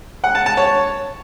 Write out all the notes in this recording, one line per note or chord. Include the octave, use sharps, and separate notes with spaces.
F#5
A5
A5
C#5